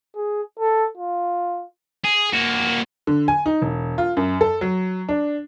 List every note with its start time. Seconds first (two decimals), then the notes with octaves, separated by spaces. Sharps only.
0.16 G#4
0.59 A4
0.97 F4
2.05 G#4
2.33 A#3 F#4
3.07 D3
3.28 G#5
3.46 D#4
3.62 E1
3.98 F4
4.17 F#2
4.41 A4
4.61 F#3
5.09 D4